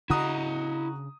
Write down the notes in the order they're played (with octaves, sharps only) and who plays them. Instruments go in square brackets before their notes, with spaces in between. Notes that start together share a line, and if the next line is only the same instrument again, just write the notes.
[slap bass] C#3 D4 [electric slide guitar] E4 D#5 [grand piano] F#4 A#5 D#6